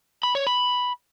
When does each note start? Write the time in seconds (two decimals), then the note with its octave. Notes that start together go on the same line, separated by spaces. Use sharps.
0.23 B5
0.35 C#5
0.47 B5